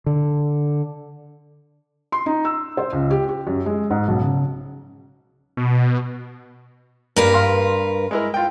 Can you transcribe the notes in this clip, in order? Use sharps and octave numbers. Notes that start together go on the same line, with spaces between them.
D3
C6
D#4
E6
C5
C#2
G4
G4
F#2
G#3
G#2
B1
C#3
B2
G2 A#3 A#4 B4
F5 C6
G#3 E4 A#4
F4 G5